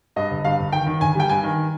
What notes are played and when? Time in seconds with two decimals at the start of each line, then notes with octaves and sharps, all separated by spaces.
0.16 G2 D#5
0.30 G1
0.44 G2 F5
0.59 G1
0.72 D#3 G5
0.87 D#3
1.01 G1 G#5
1.15 G3 G5
1.29 G2 G#5
1.43 D#3